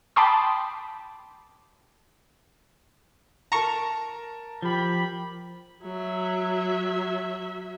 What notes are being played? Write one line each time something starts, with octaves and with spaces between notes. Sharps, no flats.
G5 A5 B5 C6 D6 D#6
A#4 A5 A#5 C#6
F3 G4 G5 B5
F#3 E5